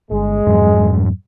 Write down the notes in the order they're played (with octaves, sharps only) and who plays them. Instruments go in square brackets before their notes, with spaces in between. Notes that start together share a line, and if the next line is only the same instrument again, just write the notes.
[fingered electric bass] G1 [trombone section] G#3
[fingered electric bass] F2 G#2 F#3